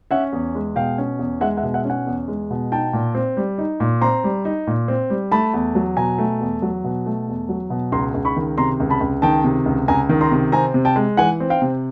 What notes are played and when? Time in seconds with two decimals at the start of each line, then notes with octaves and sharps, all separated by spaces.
0.11 C#4 E5 F#5
0.33 E2
0.55 G#3
0.76 B2 F5 G5
0.98 C#4
1.19 E2
1.41 G#3 E5 F#5
1.57 E5 F#5
1.63 B2
1.74 E5 F#5
1.85 C#4
1.90 F#5 G#5
2.06 E2
2.28 G#3
2.51 B2
2.72 D#4 G5 A5
2.93 A#2
3.15 C4
3.37 G3
3.58 D#4
3.80 A#2
4.01 C4 A#5 C6
4.24 G3
4.45 D#4
4.67 A#2
4.88 C4
5.10 G3
5.32 A3 A5 B5
5.54 E2
5.75 F#3
5.97 B2 G#5 A#5
6.18 A3
6.41 E2
6.62 F#3
6.84 B2
7.06 A3
7.28 E2
7.49 F#3
7.70 B2
7.92 C#2 A#5 C6
8.14 C#2
8.25 B5 C#6
8.36 D#3
8.58 C3 A#5 C6
8.80 C#2
8.90 A5 B5
9.00 C#2
9.22 D#3 G5 A5
9.44 C3
9.66 C#2
9.88 C#2 G#5 A#5
10.09 D#3
10.21 A#5 C6
10.31 C3
10.52 C4 G#5 A#5
10.74 C3
10.85 G5 A5
10.96 G#3
11.17 E3 F#5 G#5
11.40 C4
11.50 F5 G5
11.62 C3